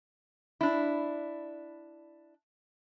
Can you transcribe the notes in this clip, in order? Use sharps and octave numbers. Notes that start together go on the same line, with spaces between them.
D4 E4